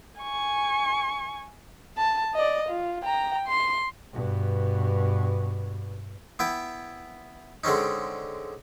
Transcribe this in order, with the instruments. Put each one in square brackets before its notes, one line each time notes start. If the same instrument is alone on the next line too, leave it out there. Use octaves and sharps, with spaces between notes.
[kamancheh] G#5 C#6
A5
D5 D#5
F4
G5 A#5
C6
[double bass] G2 B2
[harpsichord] B3 E4 G5
D3 G#3 C4 C#4 D#4